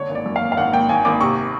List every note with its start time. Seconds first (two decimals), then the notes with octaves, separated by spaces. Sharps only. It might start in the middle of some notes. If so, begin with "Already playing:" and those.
Already playing: D3 C#5
0.09 G#1
0.15 D5
0.26 F#2
0.36 F5
0.41 G#1
0.52 F5
0.57 G#1 F#5
0.73 G#1 G5
0.89 G#1 G#5
1.05 G#1 D6
1.21 C3 C#6